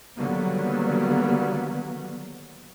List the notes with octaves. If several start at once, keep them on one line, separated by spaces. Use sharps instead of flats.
D3 D#3 F#3 G3 A#3 B3